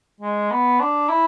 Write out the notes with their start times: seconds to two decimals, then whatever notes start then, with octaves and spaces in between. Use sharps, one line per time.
0.20 G#3
0.51 B3
0.80 D4
1.09 E4